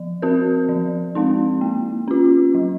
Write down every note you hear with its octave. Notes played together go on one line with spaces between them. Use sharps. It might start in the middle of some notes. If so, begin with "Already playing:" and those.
Already playing: F3
C4 F#4 A#4
F3
G#3 C4 D#4
A#3
C#4 F4
F#3